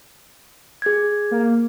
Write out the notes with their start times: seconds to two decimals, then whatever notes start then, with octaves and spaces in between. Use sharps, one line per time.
0.82 G#4 G#6
1.31 A#3